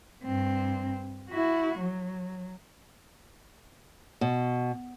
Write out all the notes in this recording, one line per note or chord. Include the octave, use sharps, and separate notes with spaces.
G2 C4
E4 F#4
F#3
B2